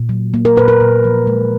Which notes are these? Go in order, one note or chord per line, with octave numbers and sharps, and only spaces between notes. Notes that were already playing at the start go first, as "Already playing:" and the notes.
Already playing: A#2
F#3
A#3
A#4
A#2 B4
A#4
A#2
F3
G#3